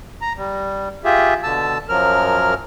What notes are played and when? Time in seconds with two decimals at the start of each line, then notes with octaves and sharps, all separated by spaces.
0.22 A#5
0.37 G3
1.05 F4 G4 G#4 E5
1.43 B2 D3 A5 E6
1.89 F#2 F3 F#3 A#4 F6